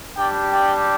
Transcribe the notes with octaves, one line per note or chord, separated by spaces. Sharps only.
G3 D4 G4 D5 G5
D5 G5